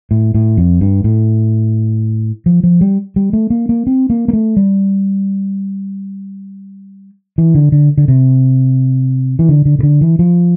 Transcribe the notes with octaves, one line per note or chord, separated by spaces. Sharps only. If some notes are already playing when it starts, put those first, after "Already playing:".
A2
A2
F2
G2
A2
F3
F3
G3
G3
A3
A#3
A#3
C4
A#3
A#3
A3
G3
E3
D3
D3
D3
C3
E3
D3
D3
C3
D3
E3
F3